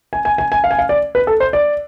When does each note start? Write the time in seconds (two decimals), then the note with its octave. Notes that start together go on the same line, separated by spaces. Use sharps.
0.13 G#5
0.25 G#5
0.38 G#5
0.52 G#5
0.64 F5
0.71 G#5
0.79 F5
0.89 D5
1.15 B4
1.27 A4
1.40 C5
1.53 D5